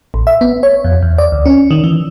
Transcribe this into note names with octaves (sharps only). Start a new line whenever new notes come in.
A1
E5
B3
C#5
F2
E2
D5
D2
C#4
D#3
E3